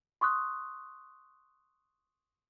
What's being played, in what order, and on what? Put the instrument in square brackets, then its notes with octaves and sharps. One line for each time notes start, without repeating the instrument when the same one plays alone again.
[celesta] C6 C#6 D#6 F#6